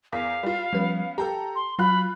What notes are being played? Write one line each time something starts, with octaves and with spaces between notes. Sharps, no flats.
E2 A#4 F5 B6
G3 F4
F3 G3 B3 C#4 B4
G4 A4 G5 A5 A#5
C6
F#3 F4 F5 B5 F#6